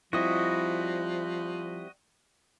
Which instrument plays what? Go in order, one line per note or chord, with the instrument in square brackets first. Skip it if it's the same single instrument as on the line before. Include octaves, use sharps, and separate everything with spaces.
[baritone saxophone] F3 [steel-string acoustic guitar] G3 C4 E4 [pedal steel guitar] F#4 D#5